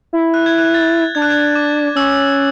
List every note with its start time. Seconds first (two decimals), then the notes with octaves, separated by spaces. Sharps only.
0.13 E4
0.34 F#6
0.46 G#6
0.58 F#6
0.74 A6
1.15 D4 G#6
1.22 F#6
1.30 G#6
1.55 D6
1.95 C#4 E6